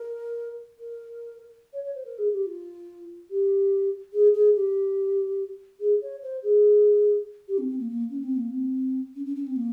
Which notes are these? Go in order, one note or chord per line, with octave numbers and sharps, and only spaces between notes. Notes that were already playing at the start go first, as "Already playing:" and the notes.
Already playing: A#4
A#4
C#5
C#5
C5
A#4
G#4
G4
F4
G4
G#4
G#4
G4
G#4
C#5
C5
G#4
G4
C4
C4
A#3
A#3
C#4
C4
A#3
C4
C#4
C#4
C#4
C4
A#3